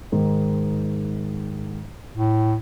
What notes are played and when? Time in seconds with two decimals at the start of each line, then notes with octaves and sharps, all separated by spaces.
0.12 G#2 D#3 G#3
2.14 A2